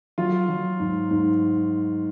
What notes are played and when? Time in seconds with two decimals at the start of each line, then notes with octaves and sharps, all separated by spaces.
0.18 F#3 F4
0.49 F#3
0.80 G#2
1.11 G#2